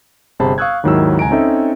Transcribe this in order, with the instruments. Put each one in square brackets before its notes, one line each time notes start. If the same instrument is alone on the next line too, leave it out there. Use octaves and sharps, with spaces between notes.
[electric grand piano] G1 C3 G#4 C5 A5 B5
F5 C#6 D#6 E6 F#6 G#6
D#2 G#2 D#3 F#3 E4 E6
C#2 G#5 A#5 D7
C4 C#4 D#4 A4 E5